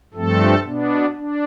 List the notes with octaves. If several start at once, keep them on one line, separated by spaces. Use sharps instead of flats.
G2 F3 A3 C4 A4
B2 B3 D4
D4